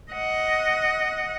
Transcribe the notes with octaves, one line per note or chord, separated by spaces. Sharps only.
D#5 F#5